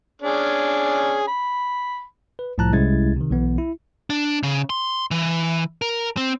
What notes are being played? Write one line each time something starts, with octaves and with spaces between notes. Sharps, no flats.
C#4 D4 G#4
B5
B4
C2 A2 F3 A5 A#5 F#6
C2 G#3 C#4 E4 G#6 A6
C3 D#3
B1 E3 B3
E4
D4
C#3
C6
E3
A#4
C4